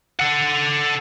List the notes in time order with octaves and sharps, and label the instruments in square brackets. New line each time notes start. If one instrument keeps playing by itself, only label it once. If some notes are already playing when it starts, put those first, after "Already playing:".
[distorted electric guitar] A4 F#5